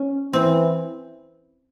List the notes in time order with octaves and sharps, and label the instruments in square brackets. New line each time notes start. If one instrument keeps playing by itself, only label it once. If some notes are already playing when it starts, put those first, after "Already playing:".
Already playing: [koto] C#4
[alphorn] E3 [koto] C4